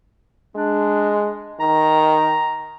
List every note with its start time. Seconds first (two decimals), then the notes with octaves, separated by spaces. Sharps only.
0.56 G#3 D4
1.60 D#3 A#5